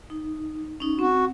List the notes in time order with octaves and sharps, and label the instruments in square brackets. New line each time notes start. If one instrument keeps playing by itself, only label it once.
[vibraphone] D#4
C#4 D#4
[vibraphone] C4 [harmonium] F#4